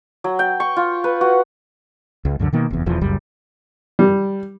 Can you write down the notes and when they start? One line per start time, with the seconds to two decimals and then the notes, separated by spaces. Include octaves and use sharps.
0.24 F#3
0.39 G5
0.60 C#6
0.77 F4
1.04 B4
1.21 F#4
2.25 C#2
2.39 C#2 F#2 D3
2.53 B2 D#3 A#3
2.71 F1 E2
2.86 E1 E2 E3 F3
3.01 F#1 C#2 F#2 G3
3.99 G3